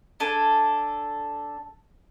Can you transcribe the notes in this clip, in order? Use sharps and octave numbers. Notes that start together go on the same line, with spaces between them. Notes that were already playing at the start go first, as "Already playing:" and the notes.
D4 A4 G#5